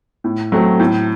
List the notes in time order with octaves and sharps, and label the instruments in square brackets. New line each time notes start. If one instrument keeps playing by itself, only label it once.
[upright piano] A2
F#3 A3 C4
A2